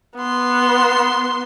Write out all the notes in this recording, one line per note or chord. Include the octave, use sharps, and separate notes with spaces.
B3 C6